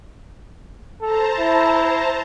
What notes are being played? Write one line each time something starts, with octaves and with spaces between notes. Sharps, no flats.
A4 C5 A5 A#5
E4